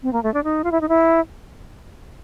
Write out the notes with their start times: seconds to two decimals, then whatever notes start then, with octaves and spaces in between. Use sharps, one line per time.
0.03 C4
0.13 A#3
0.23 A3
0.34 D4
0.44 D#4
0.64 F4
0.72 E4
0.81 D#4
0.89 E4